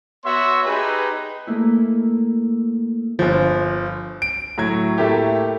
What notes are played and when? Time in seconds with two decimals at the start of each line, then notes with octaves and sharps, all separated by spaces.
0.24 B3 F#4 C#5 E5 C6
0.64 D#4 G4 G#4 B4
1.47 A3 A#3 E4
3.19 G1 F3
4.22 D7
4.58 A2 F#3 G#6
4.98 A2 A3 A#3 G4